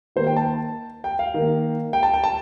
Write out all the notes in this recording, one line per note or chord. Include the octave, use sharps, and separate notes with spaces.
D#3 A#3 C5
G5
A5
G5
F5
D#3 A#3
G5
A5
G5
A5